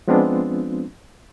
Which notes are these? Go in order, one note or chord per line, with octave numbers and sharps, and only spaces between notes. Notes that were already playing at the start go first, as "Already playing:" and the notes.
F3 G#3 B3 C4 D4 F4